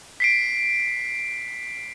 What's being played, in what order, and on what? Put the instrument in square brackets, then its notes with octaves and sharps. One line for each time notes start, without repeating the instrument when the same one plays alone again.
[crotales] B6 C7 D7